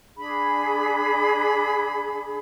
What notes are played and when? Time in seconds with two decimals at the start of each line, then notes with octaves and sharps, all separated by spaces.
0.18 D4 G#4 B5